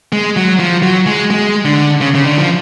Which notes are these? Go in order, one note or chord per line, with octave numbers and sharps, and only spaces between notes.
G#3
F#3
F3
F#3
G#3
G#3
D3
C#3
C#3
D3
F3